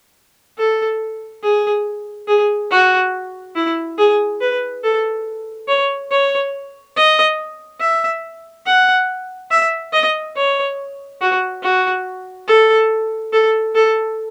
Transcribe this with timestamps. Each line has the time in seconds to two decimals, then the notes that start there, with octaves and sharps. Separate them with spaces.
0.58 A4
1.43 G#4
2.28 G#4
2.71 F#4
3.55 E4
3.98 G#4
4.41 B4
4.84 A4
5.68 C#5
6.11 C#5
6.96 D#5
7.81 E5
8.66 F#5
9.51 E5
9.93 D#5
10.36 C#5
11.21 F#4
11.63 F#4
12.47 A4
13.33 A4
13.75 A4